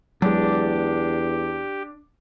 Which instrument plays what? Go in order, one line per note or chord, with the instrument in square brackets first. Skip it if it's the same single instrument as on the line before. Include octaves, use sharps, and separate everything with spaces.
[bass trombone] E2 [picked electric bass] F#3 G#3 [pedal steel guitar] D4 [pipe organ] G4